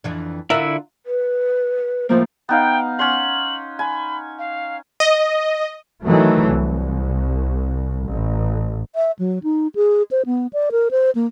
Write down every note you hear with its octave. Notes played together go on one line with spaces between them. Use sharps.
F2 E3 D4
D3 D4 E4 F4 A#4 E5 F#5
B4
A2 F3 A#3 C5
B3 D#4 F5 G5
C#4 F#5 C6 F#7
G#5 B5
F5
D#5
D#3 E3 F#3 A3
C2
A1
E5
F#3
D#4
G#4
C5
B3
D5
A#4
C5
A#3